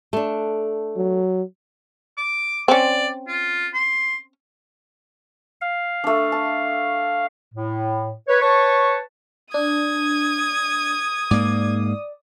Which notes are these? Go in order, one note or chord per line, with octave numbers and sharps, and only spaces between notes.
A3 D4
F#3
D6
C4 C#4 D5
F4
C6
F5
A3 D4
A5
A2
B4 C#5
B4 C#5 A5 C#6
D4 D#6 G#6
G#2 A#3 D5